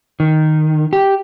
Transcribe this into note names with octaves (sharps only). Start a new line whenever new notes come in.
D#3
G4